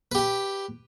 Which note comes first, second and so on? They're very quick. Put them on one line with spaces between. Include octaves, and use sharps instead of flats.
B4 G4 G5